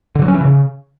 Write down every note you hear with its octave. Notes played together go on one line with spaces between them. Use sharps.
D3
F#3
C#4
E3
C#3